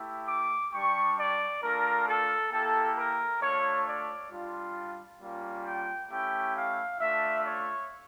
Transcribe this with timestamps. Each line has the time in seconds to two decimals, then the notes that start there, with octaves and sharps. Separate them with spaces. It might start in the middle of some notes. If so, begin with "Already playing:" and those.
Already playing: A3 E4 G4
0.28 D6
0.73 G3 D4 G4 C#6
1.18 D5
1.63 A3 D4 F4 A#4
2.08 A4
2.52 A#3 E4 G4 A4
2.98 A#4
3.42 A3 D4 F4 C#5
3.87 D5
4.31 G3 D4 F4
5.21 G3 A#3 C#4 F4
5.66 G5
6.10 A3 C#4 E4 G4 G5
6.55 F5
6.99 A3 D4 F4 E5
7.45 C#5